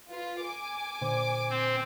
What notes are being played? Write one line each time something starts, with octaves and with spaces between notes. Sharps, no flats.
F4 B4
G#5 D6
A#2 D3 C5
C4